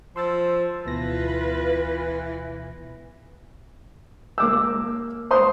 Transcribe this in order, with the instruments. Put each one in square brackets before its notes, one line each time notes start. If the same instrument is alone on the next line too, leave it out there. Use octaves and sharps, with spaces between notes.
[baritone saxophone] F3 [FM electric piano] C6 E6 A6
[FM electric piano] D2 B2 A#6 [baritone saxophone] E3 [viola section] F4 B4
[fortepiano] A#3 D6 E6
C5 C6 D#6